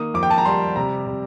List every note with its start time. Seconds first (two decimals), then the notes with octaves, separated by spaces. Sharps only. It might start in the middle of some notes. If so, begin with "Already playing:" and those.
Already playing: D#3 A#3 D#4 D#6
0.14 F2 D6
0.23 G5
0.30 A5
0.38 A#5
0.45 G3 C6
0.76 C3 A#5
1.07 C3